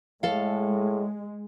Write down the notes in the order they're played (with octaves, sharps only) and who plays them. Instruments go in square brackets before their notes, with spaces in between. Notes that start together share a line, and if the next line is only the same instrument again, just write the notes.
[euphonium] A2 [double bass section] G#3 [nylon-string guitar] A4 F5